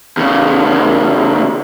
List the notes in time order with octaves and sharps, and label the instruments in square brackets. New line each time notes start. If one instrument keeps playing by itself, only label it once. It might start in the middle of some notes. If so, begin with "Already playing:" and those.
[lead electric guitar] E2 C#3